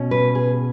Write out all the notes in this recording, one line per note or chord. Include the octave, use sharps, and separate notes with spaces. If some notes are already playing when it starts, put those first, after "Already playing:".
Already playing: B2 C#4
B4
G#4